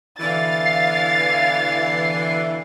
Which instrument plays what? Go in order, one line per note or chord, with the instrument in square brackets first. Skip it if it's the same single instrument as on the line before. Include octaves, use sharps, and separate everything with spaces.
[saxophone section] B2 D3 E3 [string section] F5 A6
[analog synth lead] C7